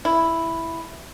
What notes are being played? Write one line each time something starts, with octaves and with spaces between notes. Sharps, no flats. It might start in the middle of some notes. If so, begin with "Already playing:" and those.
E4